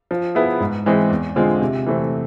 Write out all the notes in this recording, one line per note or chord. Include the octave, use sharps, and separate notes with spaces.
F3
B3 E4 G#4 B4
G#2
E3 G#3 C4 G#4
E2
D3 G#3 C4 F4
C3
E3 A3 C4